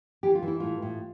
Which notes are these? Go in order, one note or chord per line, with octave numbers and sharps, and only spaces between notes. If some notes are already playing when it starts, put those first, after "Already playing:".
E3 G4
F4
E3
E4
A2 F4
A2